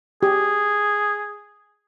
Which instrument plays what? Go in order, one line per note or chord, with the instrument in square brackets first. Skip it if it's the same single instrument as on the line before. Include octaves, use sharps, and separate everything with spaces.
[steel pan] G4 [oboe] G#4